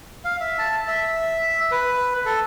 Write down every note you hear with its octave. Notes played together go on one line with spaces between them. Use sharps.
F5
E5
A5
E5
B4
A4